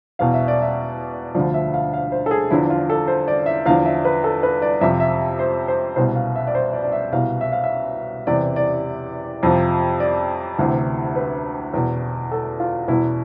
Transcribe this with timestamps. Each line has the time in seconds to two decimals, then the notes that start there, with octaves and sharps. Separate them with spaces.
0.19 E2 B2 F5
0.34 E5
0.48 D5
0.62 E5
1.35 D2 D3 F3 D5
1.54 E5
1.74 F5
1.93 F5
2.12 C5
2.26 A4
2.31 G#4
2.50 E2 D3 F3 E4
2.70 F4
2.90 A4
3.08 C5
3.28 D5
3.46 E5
3.66 E2 D3 F3 F5
3.86 E5
4.05 B4
4.24 A4
4.43 B4
4.62 D5
4.81 F2 C3 F3 E5
5.00 E5
5.39 C5
5.68 C5
5.96 C2 B2 C5
6.16 F5
6.36 E5
6.47 D5
6.55 C5
6.73 D5
6.84 D5
6.92 E5
7.12 C2 B2 F5
7.41 E5
7.52 F5
7.64 E5
8.27 E2 C3 E3 D5
8.56 D5
9.43 F2 C3 F3
10.00 D5
10.59 D2 C3 E3
11.16 B4
11.73 E2 B2
12.32 A4
12.60 F4
12.88 B2 E4
12.93 E2